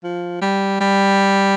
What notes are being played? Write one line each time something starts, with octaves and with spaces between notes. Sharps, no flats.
F3
G3
G3